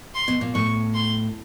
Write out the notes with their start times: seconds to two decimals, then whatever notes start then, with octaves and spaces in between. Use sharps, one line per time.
0.14 C6
0.28 B2
0.41 A#2
0.55 A2 C#6
0.94 C6